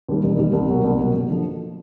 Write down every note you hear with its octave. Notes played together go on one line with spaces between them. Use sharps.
D#2 D#3 G3
E1
D#2 D#3 G3
C2
B2 F#3 A#3
C2
B2 F#3 A#3
F#1
D3 F3